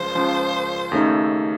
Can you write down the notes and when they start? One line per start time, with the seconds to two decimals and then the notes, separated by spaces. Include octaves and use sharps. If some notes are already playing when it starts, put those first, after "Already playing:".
Already playing: C#2 C#3 F3 C5
0.15 C#2 C#3 F3
0.92 D#2 C#3 A3 D#4